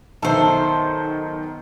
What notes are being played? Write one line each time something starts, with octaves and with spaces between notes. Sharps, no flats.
B1 D#3 A4 C5 E5